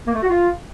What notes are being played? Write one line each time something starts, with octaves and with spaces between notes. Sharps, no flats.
A#3
A3
F#4
F4